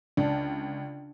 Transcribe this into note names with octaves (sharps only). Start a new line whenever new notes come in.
C#2 D4